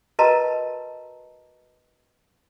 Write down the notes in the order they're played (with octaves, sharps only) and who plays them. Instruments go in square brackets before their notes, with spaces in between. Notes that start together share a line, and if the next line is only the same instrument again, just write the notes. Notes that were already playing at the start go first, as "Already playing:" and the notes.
[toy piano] F#4 A#4 B4 D#5 A5 A#5